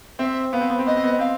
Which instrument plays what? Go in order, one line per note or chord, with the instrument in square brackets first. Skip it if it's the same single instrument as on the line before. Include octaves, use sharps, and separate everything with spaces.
[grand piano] C4 [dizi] E5
[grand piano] B3 [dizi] F5
[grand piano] C4
B3
C4
[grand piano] B3 [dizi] D#5
[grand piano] C4
B3
[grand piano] C4 [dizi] F5